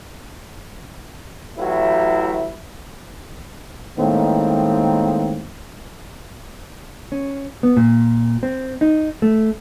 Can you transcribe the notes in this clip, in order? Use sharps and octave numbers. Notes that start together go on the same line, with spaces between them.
A1 F#3 E4
A2 D#3 G#3 A#3 C4
C#4
B3
A#2
C4
D#4
A3